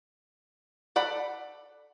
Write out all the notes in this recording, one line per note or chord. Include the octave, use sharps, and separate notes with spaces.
A4 D5 F#5 B5